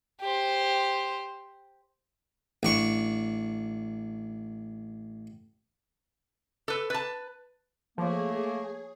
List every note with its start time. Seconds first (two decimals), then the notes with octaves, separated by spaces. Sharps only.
0.21 G4 C5
2.63 A1 D4 C#6
6.68 A4 B4
6.90 B4 A5
7.98 F3 A3 A#3 G#4 C#5 A5